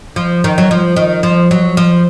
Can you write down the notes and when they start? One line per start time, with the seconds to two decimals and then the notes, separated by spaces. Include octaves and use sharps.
0.16 F3
0.44 D#3
0.58 F#3
0.71 F3
0.96 D#3
1.23 F3
1.51 F#3
1.77 F3